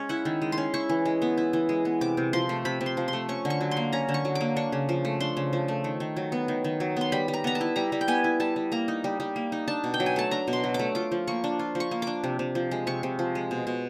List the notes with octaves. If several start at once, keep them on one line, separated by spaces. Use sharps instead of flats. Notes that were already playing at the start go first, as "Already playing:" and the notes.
Already playing: G#3 C#4 C#5
E4 F#5
D#3
G#3
C6
C#4
E4 C#6
E3
G#3
B3
E4
E3
G#3
B3
C3 D6
C3
F3 C6
A3
C3 B5
C3
C6
F3
C6
A3
C#4 C#6
D3
C#6
F#3
C6
A#3
C#4 A#5
D3
C#6
F#3
D6
A#3
D4 C#6
C#3
F3
A3
D4 C6
C#3
F3
A3
D#3
D#3
F#3
B3
D#3
D#3
F#3
B3 C6
G3 B5
G3
A#5
B3 A#5
A5
E4
G3 A#5
G3
G5
B3 G#5
E4
G3 A5
G3
A#3 A#5
D#4
G3
G3
A#3
D#4
D4 A5
B2
G5
F#3
G#5
A3 A5
D4 A#5
B2
C6
F#3
A3 D6
F4 D6
F3
A#3 C#6
D4
F4
F3
C#6
A#3
D4 D6
C3
C3
F3
G#3
C3 C#6
C3
F3
G#3
B2
B2